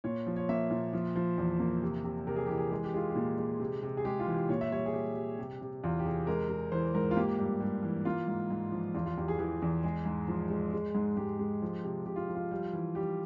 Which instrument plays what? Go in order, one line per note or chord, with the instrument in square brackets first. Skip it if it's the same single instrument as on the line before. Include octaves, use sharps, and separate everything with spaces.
[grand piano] A#2 C#5
F3
C#5
A#3 E5
A#2
F3
F3
E2
A#3
C3
C3
C3 A#4
G#4
E3 G4
G#4
G#3 G#4
G4
G#3 F4
G4
A#2
G#3
C3
C3
G#4
G#3 G4
F4
E3
G4
A#2 C#5
E5
G3 C#5
G#4
G3 G4
G3
C3
C3
E2 F4
G4
C3 G#4
G#3 A#4
G#3
E3 C5
G#2 A#4
F4
A#3 G4
G2
G2
E3
A#3 F4
G#2
G#2
F3
E2 F4
F4
E2 G4
G#4
E3 G#4
E2
G#3 G#4
G#2
F3
G#3
G#3
G#2
G#2 G4
G#3
F3
C3
C3 G4
F4
F3
F4
G3
E3
G3 G4